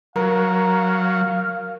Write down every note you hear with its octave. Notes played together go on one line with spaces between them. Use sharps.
F#3 A#4 F5